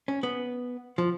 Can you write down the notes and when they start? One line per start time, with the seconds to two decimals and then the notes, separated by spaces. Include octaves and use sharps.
0.08 C#4
0.23 B3
0.98 F3